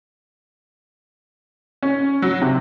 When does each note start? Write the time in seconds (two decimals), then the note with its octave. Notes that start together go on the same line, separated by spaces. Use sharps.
1.83 C#4
2.22 F#3
2.42 C3